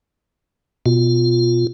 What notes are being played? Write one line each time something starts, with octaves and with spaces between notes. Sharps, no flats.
B2 F4